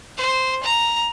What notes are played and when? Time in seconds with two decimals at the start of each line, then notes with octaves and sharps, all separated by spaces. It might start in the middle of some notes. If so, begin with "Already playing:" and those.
0.17 C5
0.64 A#5